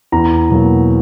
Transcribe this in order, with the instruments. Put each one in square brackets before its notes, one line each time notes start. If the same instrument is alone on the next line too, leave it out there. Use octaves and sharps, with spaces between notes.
[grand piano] E2 A#5
B2 F#3 A#3